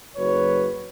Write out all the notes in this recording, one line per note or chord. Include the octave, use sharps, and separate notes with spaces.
F#1 F#3 B4 C#5